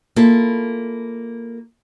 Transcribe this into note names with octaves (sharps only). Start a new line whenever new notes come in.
A#3 E4 F4 A4